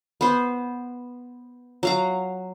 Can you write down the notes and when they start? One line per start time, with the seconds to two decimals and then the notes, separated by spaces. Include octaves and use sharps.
0.21 B3 C5
1.83 F#3 F5 A#5